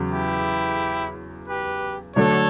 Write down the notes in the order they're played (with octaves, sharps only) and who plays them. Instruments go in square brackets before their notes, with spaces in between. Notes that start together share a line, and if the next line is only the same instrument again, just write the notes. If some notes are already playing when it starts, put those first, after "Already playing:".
Already playing: [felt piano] E2 C#3 F#3
[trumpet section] E4 G4
G4 B4
[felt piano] D3 F#3 A3 D4 [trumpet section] A4 C#5